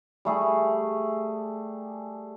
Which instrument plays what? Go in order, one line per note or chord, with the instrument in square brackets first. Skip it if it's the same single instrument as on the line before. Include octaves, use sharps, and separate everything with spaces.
[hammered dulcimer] G3 A3 G#4